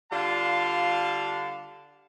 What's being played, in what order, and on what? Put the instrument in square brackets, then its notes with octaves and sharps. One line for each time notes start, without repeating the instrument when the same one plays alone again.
[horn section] D3 G3 F4 F5 A5